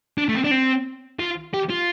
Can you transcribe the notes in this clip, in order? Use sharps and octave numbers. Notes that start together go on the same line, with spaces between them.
D4
A3
C4
D4
C4
F4
G4
F4